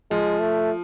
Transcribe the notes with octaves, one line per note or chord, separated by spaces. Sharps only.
F3 G#3
A3